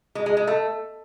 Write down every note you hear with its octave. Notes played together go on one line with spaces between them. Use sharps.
G#3
G#3
G#3
A3